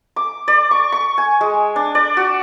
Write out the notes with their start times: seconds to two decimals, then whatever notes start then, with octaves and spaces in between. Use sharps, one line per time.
0.16 D6
0.48 D5
0.71 C#6
0.92 C#6
1.18 G#5
1.41 G#3
1.76 D4
1.95 D5
2.17 F#4